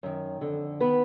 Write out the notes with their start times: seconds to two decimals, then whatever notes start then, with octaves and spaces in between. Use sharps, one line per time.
0.03 F#2 D#3
0.41 F2 D3
0.80 D#3 B3 B4